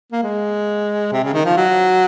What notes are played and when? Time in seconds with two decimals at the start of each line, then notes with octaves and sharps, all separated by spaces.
0.12 A#3
0.23 G#3
1.12 C3
1.24 C#3
1.34 D#3
1.45 F3
1.57 F#3